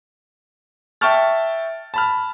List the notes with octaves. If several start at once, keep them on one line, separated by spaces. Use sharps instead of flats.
E5 G5 A5 C#6 F6 A6
A5 B5 F6